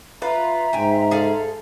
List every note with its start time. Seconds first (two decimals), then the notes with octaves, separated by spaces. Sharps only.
0.22 F4 B4 E5 A#5 C6
0.73 G#2 G5 G#5
1.11 G#4 A4 F5